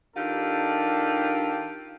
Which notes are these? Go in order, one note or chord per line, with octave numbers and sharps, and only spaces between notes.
D#3 D4 F4 G4 A4